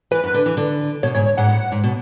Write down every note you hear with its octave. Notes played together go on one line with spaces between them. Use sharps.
E3 B4
F#2
D3
E3
D3
B2 C#5
G#2 C#5
C#5
G#2 F#5
A2
G#2
B2